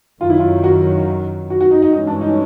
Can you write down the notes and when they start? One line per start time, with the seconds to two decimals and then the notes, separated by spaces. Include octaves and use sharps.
0.21 F#2 D#3 F#3 F4
0.30 E4
0.39 F4
0.64 F#4
1.50 F#4
1.60 F#4
1.71 D#4
1.82 D#4
1.93 G2 E3 G#3 C#4 D#4
2.07 D4
2.21 D#4